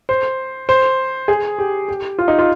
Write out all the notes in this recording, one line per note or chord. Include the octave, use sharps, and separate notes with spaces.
C5
C5
G#4
G4
G4
F4
D#4
F4